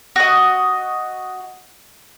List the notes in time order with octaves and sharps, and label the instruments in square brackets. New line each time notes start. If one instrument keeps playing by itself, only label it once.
[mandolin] F#4 D#5